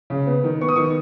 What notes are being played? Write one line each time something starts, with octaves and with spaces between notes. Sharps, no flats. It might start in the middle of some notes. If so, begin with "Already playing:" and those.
C#3
B3
D#3
B3 C#6
D#6
D#3 C#6